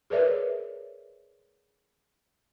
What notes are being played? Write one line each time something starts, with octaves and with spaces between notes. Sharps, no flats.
G#4 A#4 B4 C#5 D5 E5